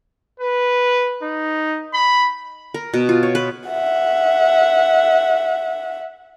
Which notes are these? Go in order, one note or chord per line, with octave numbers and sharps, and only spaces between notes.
B4
D#4
B5
A#4
B2
F4
C#5
B4
E5 F#5